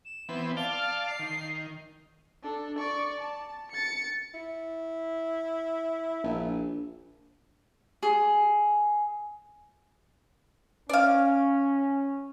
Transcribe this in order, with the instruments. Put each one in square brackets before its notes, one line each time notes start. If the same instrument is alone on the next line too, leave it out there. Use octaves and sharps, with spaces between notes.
[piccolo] E7
[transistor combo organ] E3 B3 C4
[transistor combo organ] D5 F5 A5 [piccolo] G7
[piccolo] F6
C7
[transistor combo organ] D#3
[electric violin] D4 A4
D5 C#6
A5
A6 C#7
[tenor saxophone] E4
[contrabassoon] A#1
[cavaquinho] G#4
[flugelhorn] C#4 [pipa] D5 F5